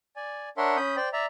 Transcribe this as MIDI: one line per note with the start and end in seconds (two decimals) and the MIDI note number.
0.16 0.49 74
0.16 0.49 80
0.57 0.77 62
0.57 0.77 70
0.57 0.77 73
0.57 0.77 76
0.57 0.77 78
0.57 0.77 84
0.77 0.96 61
0.77 0.96 83
0.77 0.96 87
0.77 0.96 91
0.97 1.09 72
0.97 1.09 74
0.97 1.09 79
1.13 1.26 74
1.13 1.26 76
1.13 1.26 82